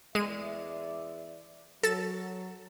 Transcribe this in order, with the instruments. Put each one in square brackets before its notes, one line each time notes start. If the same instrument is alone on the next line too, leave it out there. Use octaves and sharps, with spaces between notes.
[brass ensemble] E2 D5 E5 [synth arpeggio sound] G#3 D#7
[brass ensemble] F#3 [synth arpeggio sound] A4 A6 E7